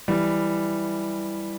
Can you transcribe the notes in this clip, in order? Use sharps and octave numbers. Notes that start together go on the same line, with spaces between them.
E3 G3